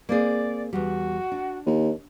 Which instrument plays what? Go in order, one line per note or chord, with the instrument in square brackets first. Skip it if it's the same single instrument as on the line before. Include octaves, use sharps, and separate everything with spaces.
[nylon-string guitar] A#3 C4 G#4 [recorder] D5
[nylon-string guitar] E2 G3 [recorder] F#4
[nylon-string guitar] D4
[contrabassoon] D#2